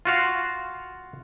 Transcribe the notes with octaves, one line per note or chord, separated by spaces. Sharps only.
F4 F#4 F5